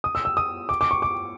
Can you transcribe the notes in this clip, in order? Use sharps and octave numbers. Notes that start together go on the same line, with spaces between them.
D#6
E6
E6
D#6
D6
D6
C#6
D6